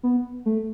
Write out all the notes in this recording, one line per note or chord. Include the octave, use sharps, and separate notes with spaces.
B3
A3